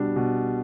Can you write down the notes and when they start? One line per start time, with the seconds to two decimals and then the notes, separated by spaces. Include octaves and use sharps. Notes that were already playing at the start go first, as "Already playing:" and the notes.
Already playing: B2 G3 D4
0.16 B2